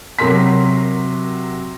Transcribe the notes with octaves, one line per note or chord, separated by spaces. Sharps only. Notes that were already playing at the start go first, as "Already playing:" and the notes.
C3 F#3 F#4 A#4 C6 B6